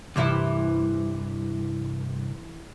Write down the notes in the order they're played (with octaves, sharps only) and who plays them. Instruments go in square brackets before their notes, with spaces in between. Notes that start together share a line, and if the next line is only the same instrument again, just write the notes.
[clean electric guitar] C2 G2 [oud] C3 E3 E4